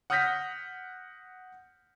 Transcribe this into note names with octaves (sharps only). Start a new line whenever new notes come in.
F#5 D#6 F6 G6 A#6 B6